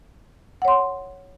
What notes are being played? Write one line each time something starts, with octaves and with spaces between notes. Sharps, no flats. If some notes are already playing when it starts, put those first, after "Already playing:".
C#5 F#5 C6